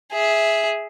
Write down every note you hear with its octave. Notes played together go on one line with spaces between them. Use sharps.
G#4 E5